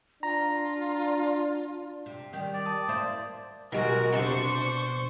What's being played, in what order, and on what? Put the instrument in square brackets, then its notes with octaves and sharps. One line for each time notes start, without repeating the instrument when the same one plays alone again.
[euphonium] D4 [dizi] F4 [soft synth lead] A#5
[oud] C3
D#3 G3 G4
[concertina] D5
[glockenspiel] A5 D#6
[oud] A#3 E4 C5
[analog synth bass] B2 [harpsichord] D#3 G3 [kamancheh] G#3 A#4 [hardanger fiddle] F#4
[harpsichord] F2 C3 A5 [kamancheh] D4 C#6 [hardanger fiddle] C5